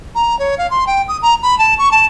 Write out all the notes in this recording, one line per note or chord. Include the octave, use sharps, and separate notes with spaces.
A#5
C#5
F5
C6
G5
D#6
A#5
B5
A5
C#6
A5